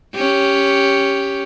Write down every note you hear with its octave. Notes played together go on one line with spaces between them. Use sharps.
C#4 G4